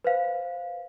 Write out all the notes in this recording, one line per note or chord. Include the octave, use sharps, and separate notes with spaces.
B4 C5 F5